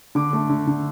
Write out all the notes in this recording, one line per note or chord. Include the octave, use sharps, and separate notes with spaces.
D3 D6
A3
D3
D3